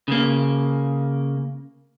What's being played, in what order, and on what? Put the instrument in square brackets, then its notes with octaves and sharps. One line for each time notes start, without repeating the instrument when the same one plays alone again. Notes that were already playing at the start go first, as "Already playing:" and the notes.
[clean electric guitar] C#3 A#3